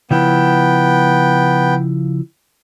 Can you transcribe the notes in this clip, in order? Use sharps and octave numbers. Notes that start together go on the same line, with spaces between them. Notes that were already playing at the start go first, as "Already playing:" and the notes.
C#3 F3 B3 E4 G5